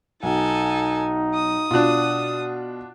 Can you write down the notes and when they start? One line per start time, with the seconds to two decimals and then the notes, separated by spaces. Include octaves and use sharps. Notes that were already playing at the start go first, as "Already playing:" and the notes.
0.23 B1 D#4 A4 G#5
1.34 D#6
1.71 B2 D4 F4 F#6